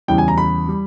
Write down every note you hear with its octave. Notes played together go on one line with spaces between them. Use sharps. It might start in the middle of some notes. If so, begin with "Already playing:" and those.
E2 C#3 E3 G3 G5
G#5
A#5
B5
G3